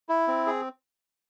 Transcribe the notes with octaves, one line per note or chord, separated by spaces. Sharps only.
E4
C4
G#4